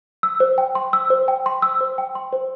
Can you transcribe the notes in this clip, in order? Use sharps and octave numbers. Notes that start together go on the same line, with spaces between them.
E6
C5
G5
C6
E6
C5
G5
C6
E6
C5
G5
C6
C5